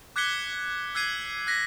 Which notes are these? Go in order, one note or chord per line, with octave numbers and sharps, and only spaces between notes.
D6 F#6 G#6 B6 C#7 G7
E6 F#6 G#6 C7 D#7
F#6 A#6 B6